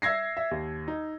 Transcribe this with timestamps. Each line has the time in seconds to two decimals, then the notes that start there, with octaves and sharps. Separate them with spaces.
0.02 E5 E6 G#6 A#6 C7
0.37 E5
0.51 D#2
0.88 D#4